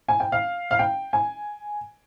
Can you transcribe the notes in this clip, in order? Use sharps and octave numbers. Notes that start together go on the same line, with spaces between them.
G#5
G5
F5
F5
G5
G#5